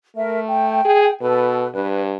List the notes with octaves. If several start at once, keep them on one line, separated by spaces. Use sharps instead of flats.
A3 A#4 E5
G5
G#4
B2 A4 B4
G2 B4